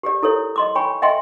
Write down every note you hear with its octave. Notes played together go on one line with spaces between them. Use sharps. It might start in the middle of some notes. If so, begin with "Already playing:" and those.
G4 G#4 D5
E4 A4 A#4 C#5
D#5 C6 D6
C#5 G5 G#5 B5 C#6
D#5 E5 G5 G#5 C6